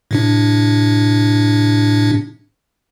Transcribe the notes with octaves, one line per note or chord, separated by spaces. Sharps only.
A2 C3 D4